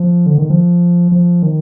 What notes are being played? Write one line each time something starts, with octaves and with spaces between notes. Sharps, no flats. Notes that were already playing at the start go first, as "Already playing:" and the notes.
Already playing: F3
D3
D#3
F3
F3
D#3